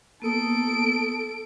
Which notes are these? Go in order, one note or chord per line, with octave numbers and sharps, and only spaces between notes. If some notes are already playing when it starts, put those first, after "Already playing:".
A#3 B3 A4 D#6 D7